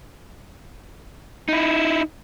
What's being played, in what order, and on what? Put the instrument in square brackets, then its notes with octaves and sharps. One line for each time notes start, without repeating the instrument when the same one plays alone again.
[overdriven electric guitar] D#4 E4